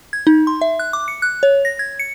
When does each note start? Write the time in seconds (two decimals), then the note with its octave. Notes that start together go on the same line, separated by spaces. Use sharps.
0.13 G#6
0.27 D#4
0.47 C6
0.61 E5
0.79 F#6
0.93 D6
1.08 C#7
1.22 F#6
1.43 C#5
1.65 A#6
1.79 G#6
1.99 C#7